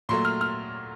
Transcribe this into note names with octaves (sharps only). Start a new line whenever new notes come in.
A#2 F#3 A3 C6
F6
F6